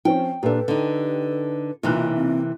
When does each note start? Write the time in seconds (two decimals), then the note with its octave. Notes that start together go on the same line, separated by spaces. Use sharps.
0.05 F3 C4 C#4 G5
0.43 A#2 D4 G4 A4 B4
0.68 D3 D#4
1.83 B1 C3 E3 A#3 F4 F#6
2.17 C4